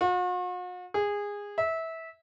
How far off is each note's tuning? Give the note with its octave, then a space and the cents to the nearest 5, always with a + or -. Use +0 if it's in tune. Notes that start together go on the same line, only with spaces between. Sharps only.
F#4 -45
G#4 -20
E5 -20